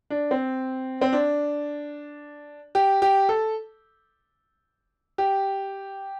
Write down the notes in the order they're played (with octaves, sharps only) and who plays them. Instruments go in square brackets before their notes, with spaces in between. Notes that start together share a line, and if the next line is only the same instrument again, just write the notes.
[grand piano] D4
C4
C4
D4
G4
G4
A4
G4